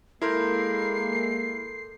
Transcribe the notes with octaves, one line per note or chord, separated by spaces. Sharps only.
G#3 A#3 E4 A4 A#4 C6 G6 C7